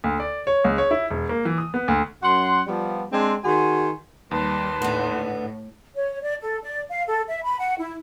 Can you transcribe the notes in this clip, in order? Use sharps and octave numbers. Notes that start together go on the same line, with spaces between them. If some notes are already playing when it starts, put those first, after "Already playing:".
D2
D5
C#5
C#2
C#5
E4
E1
A#3
E3
D#6
B3
D2
F#2 F#5 C6
F3 G3 B3
G#3 C4 D4
D#3 F#4 G#4 G#5 C6
D#2 G3 B4 A5 C6
A2 D3 B3
C#5
D5
A4
D5
F5
A4
E5
B5
F#5
E4